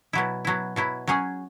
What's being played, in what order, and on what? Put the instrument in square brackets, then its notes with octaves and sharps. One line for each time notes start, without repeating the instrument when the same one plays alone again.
[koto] B2 F#3 E4
B2 F#3 E4
B2 F#3 E4
F#3 C#4 G#4